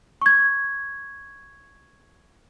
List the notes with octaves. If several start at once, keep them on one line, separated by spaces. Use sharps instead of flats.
C#6 G#6